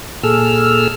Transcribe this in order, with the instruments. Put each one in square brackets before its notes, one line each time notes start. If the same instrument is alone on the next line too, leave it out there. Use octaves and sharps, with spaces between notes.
[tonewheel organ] A#2 G#4 A4 E6 F6